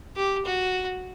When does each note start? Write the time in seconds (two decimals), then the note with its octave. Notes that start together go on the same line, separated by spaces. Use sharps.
0.16 G4
0.45 F#4